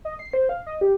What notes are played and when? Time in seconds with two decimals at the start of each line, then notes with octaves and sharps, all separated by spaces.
0.05 D#5
0.19 C7
0.33 C5
0.49 F5
0.66 D#5
0.81 G4